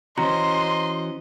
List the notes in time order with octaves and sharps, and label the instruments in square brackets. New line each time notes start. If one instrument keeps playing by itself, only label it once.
[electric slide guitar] E3 C#4 F#4 [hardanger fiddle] C5 D#5 [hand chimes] A#5 [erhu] C6